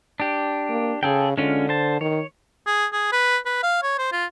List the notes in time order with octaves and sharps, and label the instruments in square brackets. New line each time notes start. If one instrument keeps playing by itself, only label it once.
[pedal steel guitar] D4 G4
[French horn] A#3
[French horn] C#3 [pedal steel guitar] G#4 A4 G5
[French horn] D3 [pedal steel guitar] G#3 C#4 F4
[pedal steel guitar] C5 A5
[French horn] D#3 [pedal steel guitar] C#5
[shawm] G#4
G#4
B4
B4
F5
C#5
C5
F4